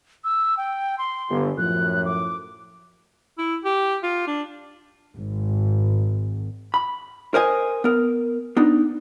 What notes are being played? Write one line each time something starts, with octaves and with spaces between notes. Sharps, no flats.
E6
G5
C6
G1
F#2 A2 F3 F#6
D6
E4
G4
F4
D4
G#1
B5
A#4 C5 D#5 G#5
B3 A#4
B3 D4 D#4